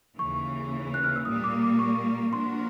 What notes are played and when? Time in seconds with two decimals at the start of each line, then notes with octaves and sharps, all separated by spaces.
0.18 D#2 C#3 E3 C#6
0.94 F#6
1.04 F6
1.16 E6
1.25 A#2 G3 A#3 D#6
1.44 D6
1.62 D6
1.79 C#6
2.33 F3 A#3 D4 F#4 A#4 C6